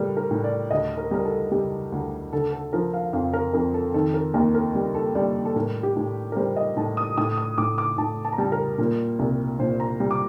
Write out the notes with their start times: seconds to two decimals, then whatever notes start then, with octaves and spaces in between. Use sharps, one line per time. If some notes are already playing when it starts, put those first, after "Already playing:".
Already playing: A2 G3 A4 A#4
0.17 A#4
0.31 A2
0.44 D5
0.71 D2 D#5
0.98 A#4
1.11 G3 A#4
1.25 A4
1.52 G3 G4
1.92 D2
2.33 D3 A4
2.52 A4
2.73 F3 A#4
2.93 F5
3.13 F2 F5
3.33 A#4
3.54 F2 A#4
3.74 A4
3.94 D#3 A4
4.14 A#4
4.34 D#2 A#4
4.54 A#4
4.75 G3
4.95 A4
5.15 G3 D5
5.45 A4
5.56 A2 A#4
5.83 G4
5.96 A2
6.32 A#4
6.36 G3 C5
6.56 D#5
6.76 A2 A5
6.97 D#6
7.17 A2 D#6
7.38 D#6
7.58 A2 D6
7.78 D6
7.98 A2 A5
8.25 A5
8.33 A#5
8.38 G3 A5
8.52 A#4
8.78 A#2 A#4
9.19 C2
9.59 A#2 C5
9.80 A#5
10.00 G3
10.11 D6